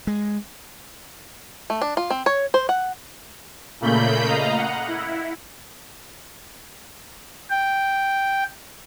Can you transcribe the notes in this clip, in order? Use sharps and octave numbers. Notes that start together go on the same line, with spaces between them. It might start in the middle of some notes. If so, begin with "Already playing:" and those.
G#3
A3
D4
F4
C4
C#5
C5
F#5
A#2 C#3 A3 A#3 B5 G6
D#5 F5 A#5
F#5
E4
G5